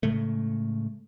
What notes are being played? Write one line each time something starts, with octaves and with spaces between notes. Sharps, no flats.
A2 C#3 G#3 A3